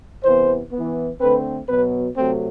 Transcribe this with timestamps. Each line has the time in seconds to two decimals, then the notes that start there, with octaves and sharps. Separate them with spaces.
0.24 C3 E3 B3 C5
0.72 B3
0.77 E3
1.20 D3 A3 C4 B4
1.68 B2 F#3 B3 B4
2.17 C3 F#3 A3 C4